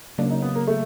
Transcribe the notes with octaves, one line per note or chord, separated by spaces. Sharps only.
C#3 F#3 A#3 D4
D#4
B3
A#3
A3